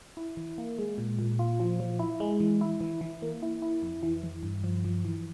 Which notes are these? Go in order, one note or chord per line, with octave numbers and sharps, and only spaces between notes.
E4
E3
A#3
G#3
A#2
A#2
F4
F3
F3
E4
G#3
E3
E4
E3
E3
A#3
E4
E4
F2
E3
E3
G2
F3
F3
E3